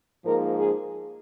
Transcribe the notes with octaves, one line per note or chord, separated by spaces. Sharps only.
G#2 F3 A#3 A#4
G#4